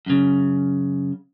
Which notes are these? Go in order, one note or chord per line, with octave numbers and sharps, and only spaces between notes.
F#2 C#3